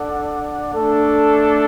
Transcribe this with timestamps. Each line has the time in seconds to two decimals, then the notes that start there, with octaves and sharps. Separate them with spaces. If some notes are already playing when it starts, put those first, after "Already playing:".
Already playing: D4 A4 D5 F#5
0.73 A3 D4 A4